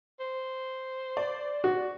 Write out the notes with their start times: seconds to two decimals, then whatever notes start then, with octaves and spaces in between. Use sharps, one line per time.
0.20 C5
1.17 D5
1.64 F#4